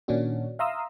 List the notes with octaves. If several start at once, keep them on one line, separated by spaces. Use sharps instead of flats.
A#2 D#3 C#4 D4 F#4
E5 F5 A#5 C6 D#6 E6